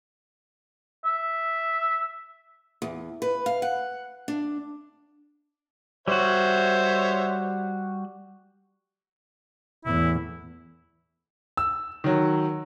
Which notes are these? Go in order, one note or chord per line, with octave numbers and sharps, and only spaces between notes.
E5
E2
B4
F5
F#5
D4
G3 F#4 C5 C#5 E5
E2 A2 E4
E6
D#3 F#3